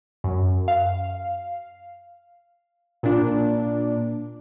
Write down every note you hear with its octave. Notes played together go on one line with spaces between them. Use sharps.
F#2
F5
A#2 D4